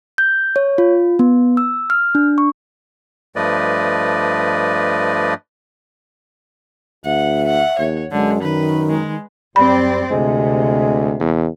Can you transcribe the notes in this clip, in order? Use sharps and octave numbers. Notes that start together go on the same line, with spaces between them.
G6
C#5
F4
B3
E6
F6
D4
C#6
G2 F3 A3 B4 D5 D#5
D2 E5 F#5
F#5
D#2 C#5
F#2 D3 G#3
D#3 B4
G#3
F#2 G3 C4 D5 B5
D2 C3 G#3
E2